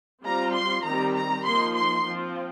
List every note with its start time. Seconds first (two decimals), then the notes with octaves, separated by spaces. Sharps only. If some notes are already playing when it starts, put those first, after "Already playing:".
0.24 G3 C4 F4 A#5
0.54 C6
0.84 D#3 G3 C4 A#5
1.15 A#5
1.44 F3 A#3 D#4 C6
1.75 C6
2.05 F3 C4 F4